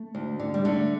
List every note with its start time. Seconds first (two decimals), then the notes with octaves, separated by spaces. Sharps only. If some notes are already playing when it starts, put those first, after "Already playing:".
Already playing: A3
0.15 D2
0.40 D3
0.54 G3
0.65 D3 A3